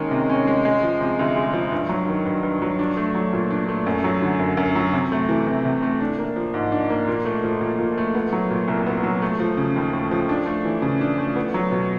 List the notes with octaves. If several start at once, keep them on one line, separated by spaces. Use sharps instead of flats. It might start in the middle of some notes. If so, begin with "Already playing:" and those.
Already playing: D#3 G#3 A#3 C#4
C3
C#4
G#3
G#3
F3
C3
D2
G#3
F3
G2
F#3
D#3
G2
G2
F#3
D4
A3
F#3
A#2
D4
A3
F#2
F#3
D3
F#2
F#2
F#3
C3
A3
E3
C3
C3
A3
D4
A#3
F3
G#2
D4
A#3
A#2
A3
F3
A#2
A#2
A3
B3
F#3
A#2
C2
B3
F#3
A3
F3
C#3
D#2
A3
F3
D4
A3
E3
C#3
D4
A3
B3
F#3
B2